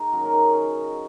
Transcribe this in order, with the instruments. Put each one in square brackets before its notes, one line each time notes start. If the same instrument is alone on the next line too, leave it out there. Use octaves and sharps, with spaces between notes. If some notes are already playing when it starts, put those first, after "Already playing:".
Already playing: [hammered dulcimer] D#4 G#4 D#5
D#3 F#3 C#4 F#4
A#4
D#4 G#4
C#3 A#4 D#5